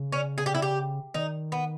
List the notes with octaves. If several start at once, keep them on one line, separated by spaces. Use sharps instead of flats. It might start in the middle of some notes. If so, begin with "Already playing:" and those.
Already playing: C#3
C#4
G#4
G4
E4
G4
D#3 D#4
B3